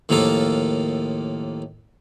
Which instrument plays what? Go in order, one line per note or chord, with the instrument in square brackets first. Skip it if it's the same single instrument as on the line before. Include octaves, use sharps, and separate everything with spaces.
[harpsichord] D#2 A2 F3 A#3 F4 A4